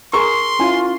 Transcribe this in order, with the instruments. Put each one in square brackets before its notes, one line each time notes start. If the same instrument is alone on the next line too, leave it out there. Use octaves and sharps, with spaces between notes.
[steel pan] G#4 E6 [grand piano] A#4 C#6 [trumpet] C6
[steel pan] C#4 E4 G#5 [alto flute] F4